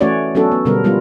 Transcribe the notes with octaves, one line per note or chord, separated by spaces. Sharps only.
E3 A3 C#4 F#4 C#5 D5
F#3 B3 C#4 D4 F#4 A4
B3
B2 D3 G3 B3 A#4
F3 G3 G#3 B3 F4